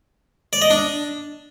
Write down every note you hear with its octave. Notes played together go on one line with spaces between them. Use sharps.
D5
D#5
D4